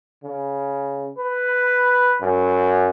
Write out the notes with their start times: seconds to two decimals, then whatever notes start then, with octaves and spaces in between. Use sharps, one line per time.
0.24 C#3
1.18 B4
2.21 F#2